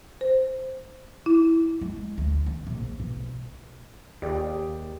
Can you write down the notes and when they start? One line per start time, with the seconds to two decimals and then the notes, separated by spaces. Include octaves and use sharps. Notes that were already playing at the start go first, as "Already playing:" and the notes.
0.21 C5
1.26 E4
1.81 G#3
2.18 D2
2.46 D#3
2.67 A#1
3.00 B1
4.22 D#2 G4 G#4 D5